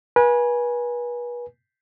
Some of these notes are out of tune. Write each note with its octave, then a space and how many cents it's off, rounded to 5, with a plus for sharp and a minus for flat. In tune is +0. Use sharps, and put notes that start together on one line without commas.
B4 -35 G#5 +0